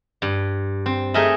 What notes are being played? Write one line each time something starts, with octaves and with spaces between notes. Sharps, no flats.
G2
C4
A3 D#4 G#4 A#4 D#5 E5